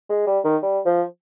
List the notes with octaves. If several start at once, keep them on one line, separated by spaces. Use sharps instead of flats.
G#3
G3
D#3
G3
F3